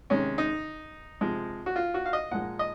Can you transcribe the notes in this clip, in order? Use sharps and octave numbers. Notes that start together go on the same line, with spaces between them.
C3 D#3 G#3 C#4
D#4
C3 F3 G#3
F#4
F4
F#4
F5
D#5
A#2 F3 G#3 F#5
D#5